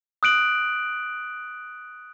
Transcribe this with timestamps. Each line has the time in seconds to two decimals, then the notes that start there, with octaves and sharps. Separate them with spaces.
0.23 D#6 F#6 D7 F#7